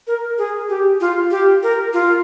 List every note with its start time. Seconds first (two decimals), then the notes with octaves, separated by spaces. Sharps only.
0.07 A#4
0.38 G#4
0.69 G4
1.00 F4
1.31 G4
1.63 A#4
1.93 F4